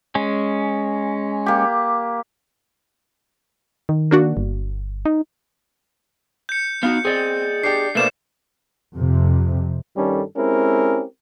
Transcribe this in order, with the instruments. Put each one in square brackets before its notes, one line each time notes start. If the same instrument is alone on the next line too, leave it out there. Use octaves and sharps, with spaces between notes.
[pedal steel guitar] G#3 C#4
[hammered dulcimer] A#3 G4
[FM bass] D#3
[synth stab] A#3 D4 F#4
[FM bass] G1
D#4
[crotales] G6 C#7
[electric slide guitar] B3 D#4 F#4 [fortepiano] F5
[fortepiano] C4 [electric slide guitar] G#4 D5 D#5
[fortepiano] D4 G4 [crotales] C7
[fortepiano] B2 A#3 D5 [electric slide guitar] A3 C5 [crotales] C7 E7
[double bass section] F2 C3
[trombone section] G2 D#3 G3 C#4 A4
G#3 C4 C#4 E4 G4 A#4